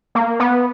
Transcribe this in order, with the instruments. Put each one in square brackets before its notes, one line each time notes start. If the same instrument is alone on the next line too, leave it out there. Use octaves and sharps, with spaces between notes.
[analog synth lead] A#3
B3